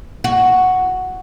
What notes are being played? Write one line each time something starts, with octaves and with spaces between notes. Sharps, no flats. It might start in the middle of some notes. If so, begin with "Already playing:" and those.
F#4